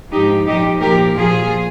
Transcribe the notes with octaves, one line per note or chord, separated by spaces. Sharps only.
G#2 F3 D#4 G4
A#2 F3 D#4 G4
A#2 F3 G4 A#4
A#2 F3 F4 G#4